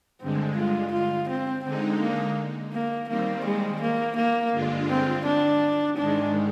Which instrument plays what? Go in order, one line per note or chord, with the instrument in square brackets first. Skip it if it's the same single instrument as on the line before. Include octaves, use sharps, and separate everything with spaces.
[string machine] G2 D3 G#3 [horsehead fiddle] C4
[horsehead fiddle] F4
F4
C4
[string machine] D3 G#3 D#4 [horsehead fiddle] C4
[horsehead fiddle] A#3
A#3
[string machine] D#3 G3 C4 [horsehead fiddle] A#3
[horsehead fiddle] G#3
A#3
A#3
[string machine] G2 D3 G#3 D4 F4
[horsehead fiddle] C4
D4
[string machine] G#2 D#3 G#3 [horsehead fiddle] D4